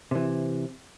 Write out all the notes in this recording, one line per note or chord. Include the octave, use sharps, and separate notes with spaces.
C3 E3